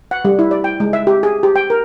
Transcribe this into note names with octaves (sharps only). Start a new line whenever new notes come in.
F#5
G3
E4
D5
G5
G#3
E5
G4
G#4
G4
G5
A#4